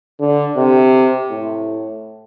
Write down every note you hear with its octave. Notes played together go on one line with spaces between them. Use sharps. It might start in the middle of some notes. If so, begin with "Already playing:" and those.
D3
C3
A2